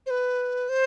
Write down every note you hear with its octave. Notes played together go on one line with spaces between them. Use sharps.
C5
B4
C5